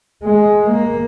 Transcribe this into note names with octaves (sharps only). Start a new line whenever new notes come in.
G#3
A#3